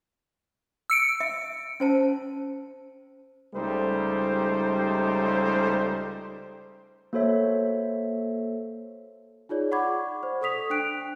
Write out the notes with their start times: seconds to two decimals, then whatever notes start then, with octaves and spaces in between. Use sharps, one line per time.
0.90 E6 C#7 D7
1.20 E5
1.80 C#4 C5 A5
3.55 C#2 G3 A3 D#4 C5
7.13 A#3 F#4 A4 C5 C#5 E5
9.49 D#4 F4 G#4 C#5 D5
9.71 D5 F#5 B5 C#6 D6 G#6
10.23 C5
10.41 A4 C#6 D#6 B6 F7
10.70 D4 G5 F#6 D7